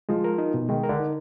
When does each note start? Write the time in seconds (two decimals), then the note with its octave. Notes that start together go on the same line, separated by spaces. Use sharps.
0.09 F3 G#3
0.24 A#4
0.38 D#4
0.54 B2
0.69 D#3 G#3
0.84 A#4
0.89 D3
0.99 D#4